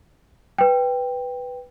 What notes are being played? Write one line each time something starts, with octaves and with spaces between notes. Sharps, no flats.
B4 G5